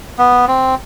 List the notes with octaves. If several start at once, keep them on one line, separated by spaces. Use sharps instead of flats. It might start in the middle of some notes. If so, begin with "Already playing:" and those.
B3
C4